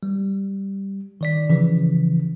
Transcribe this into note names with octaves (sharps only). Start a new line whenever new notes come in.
G3
D#3 D5 B6
C#3 E3 F3